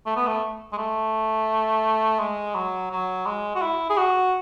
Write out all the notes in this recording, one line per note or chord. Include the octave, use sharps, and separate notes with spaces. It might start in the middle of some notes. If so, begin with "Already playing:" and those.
A3
B3
A3
G#3
A3
G#3
F#3
F#3
G#3
F#4
E4
G#4
F#4